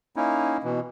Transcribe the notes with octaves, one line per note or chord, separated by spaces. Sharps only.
A#3 C#4 D#4 E4
B2 E3